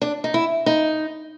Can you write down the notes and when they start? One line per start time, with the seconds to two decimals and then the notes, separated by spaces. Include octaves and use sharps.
0.01 D4
0.24 D#4
0.34 E4
0.66 D#4